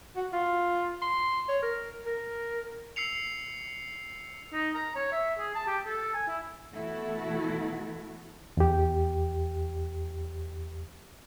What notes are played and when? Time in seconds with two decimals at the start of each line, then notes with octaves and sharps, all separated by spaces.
0.16 F#4
0.32 F4
1.01 C6
1.48 C#5
1.62 A#4
2.06 A#4
2.96 E6 C7 C#7 F7
4.52 D#4
4.75 A#5
4.96 C#5
5.12 E5
5.39 G#4
5.55 A5
5.67 G4
5.86 A4
6.14 G#5
6.28 E4
6.72 B2 E3 A3 E4 F#4 A4
8.57 E2 G4